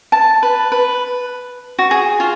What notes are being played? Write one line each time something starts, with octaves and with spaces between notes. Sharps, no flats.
A5
B4
B4
F#4
G#4
F4